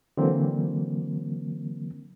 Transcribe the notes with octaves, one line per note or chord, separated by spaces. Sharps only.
D3 E3 F#3 A#3 C4